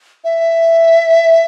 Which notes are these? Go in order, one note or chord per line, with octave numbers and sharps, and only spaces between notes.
E5